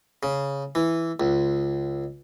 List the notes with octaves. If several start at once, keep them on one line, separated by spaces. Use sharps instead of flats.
C#3
E3
C#2